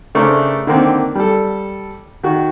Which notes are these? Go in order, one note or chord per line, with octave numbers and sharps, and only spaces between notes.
C#3 A3 D4 A#4 C5 D6
D3 D#3 A#3 C4
G3 A4
D#3 F#4